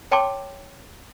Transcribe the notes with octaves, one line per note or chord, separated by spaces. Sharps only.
C#5 G5 A5 C6 D6